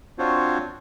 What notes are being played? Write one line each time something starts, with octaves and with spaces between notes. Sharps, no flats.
C4 D4 F4 F#4 C5 C#5